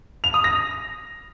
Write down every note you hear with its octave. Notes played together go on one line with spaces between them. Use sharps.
F7
D#6
A#6